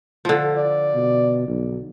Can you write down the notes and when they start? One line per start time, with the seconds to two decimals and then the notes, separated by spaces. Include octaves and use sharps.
0.25 D3 F3
0.56 D5
0.94 B2
1.48 B1